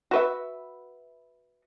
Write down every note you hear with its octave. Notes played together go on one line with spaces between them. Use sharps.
F#4 B4 E5